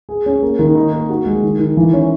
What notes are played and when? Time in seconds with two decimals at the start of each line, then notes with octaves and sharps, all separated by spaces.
0.09 G#4
0.26 C#4
0.42 A#3
0.59 D#3
0.75 D#4
0.92 A#3
1.10 F#4
1.26 G#3
1.43 D#3
1.59 D#3
1.77 E3
1.93 C#4